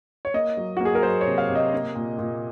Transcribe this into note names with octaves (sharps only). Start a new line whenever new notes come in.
C#5
A#3 D#5
F#3
F#4
A#3 G#4
A#4
F#3 C5
C#5
C3
F5
C3
D#5
A#3
A#2
A#2